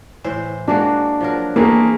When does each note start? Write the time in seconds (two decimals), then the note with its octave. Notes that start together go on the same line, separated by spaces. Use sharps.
0.24 A2 E3 C5
0.68 G#3 A#3 D4 F#4
1.21 F3 F#3 A#4
1.56 E3 A3 A#3 C4 G#4 A#4